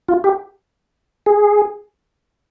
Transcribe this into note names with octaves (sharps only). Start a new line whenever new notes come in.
F4
G4
G#4